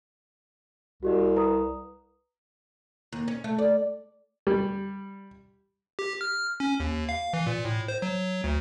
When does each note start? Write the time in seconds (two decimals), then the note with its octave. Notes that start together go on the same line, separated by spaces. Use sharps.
1.03 C2 F#4 G4 D#5
1.35 B4 A#5 D#6
3.12 D#2
3.28 C#4
3.44 A3
3.58 D5
4.47 G3
5.99 G4
6.21 F6
6.60 C#4
6.80 D#2
7.09 F5
7.33 E3
7.47 A#2
7.65 A2
7.88 C5
8.02 F#3
8.44 D2